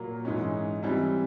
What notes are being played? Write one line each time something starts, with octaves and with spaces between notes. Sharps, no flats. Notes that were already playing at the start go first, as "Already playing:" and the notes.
Already playing: A#2 F#3 A#3
G#2 E3 G#3 C#4
E3 G3 C4